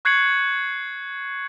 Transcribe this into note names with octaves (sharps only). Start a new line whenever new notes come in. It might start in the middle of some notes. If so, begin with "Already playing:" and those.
C#6 F#6 G#6 C7 C#7 F#7